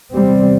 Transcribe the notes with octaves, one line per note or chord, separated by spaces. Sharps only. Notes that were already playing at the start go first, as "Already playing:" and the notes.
E2 C3 G3 C4